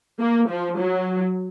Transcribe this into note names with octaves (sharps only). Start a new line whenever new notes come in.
A#3
F3
F#3